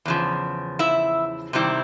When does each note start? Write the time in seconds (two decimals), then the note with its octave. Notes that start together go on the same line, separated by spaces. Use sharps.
0.05 E2 C#3 F3
0.79 E4 E5
1.53 C3 D#3 G3 C4 E4